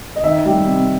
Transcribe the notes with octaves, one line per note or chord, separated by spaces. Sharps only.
D#5
D#3 E5
G3
C3